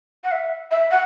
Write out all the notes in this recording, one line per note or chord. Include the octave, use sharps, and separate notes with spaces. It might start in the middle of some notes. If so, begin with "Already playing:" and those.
F#5
E5
E5
F#5